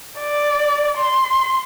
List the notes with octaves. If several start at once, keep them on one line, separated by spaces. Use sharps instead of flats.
D5
C6